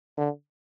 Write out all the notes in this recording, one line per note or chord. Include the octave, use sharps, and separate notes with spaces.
D3